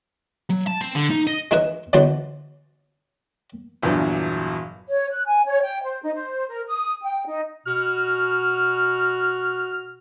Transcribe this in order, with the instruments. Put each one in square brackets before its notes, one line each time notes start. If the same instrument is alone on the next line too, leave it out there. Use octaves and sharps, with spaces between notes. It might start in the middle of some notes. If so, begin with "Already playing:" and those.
[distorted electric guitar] F#3
A5
C4
D3
D#4
D#5
[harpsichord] G#3 D#4 E4 B4 D#6
D3 E3 F#3 G#3 B3 C5
[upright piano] G1 E2 A#2 F#3 D4
[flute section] C#5
F#6
G#5
C#5
G5
C5
D#4
C5
A#4
D#6
G5
D#4
[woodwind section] B2 F#4 F6